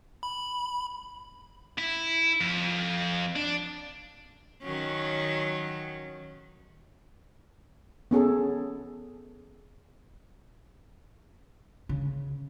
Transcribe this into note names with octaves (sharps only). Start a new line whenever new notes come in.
B5
E4
F2
D4
D#3 F#3 C#4
B3 C#4 G#4 A4
C#3